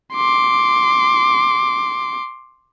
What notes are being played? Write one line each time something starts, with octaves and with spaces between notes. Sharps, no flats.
C6 D6